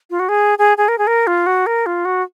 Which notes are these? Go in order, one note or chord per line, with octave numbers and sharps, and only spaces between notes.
F4
F#4
G#4
G#4
G#4
A#4
G#4
A#4
F4
F#4
A#4
F4
F#4